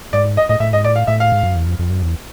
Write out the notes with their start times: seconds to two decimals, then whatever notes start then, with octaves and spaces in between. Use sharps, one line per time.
0.13 G#2 D5
0.37 D#5
0.49 A2 D#5
0.60 A2 E5
0.73 G#2 D#5
0.84 A2 D5
0.96 F5
1.07 A2 E5
1.20 F5
1.32 G#2
1.43 F#2
1.55 E2
1.66 F2
1.79 F2
1.90 F#2
2.03 E2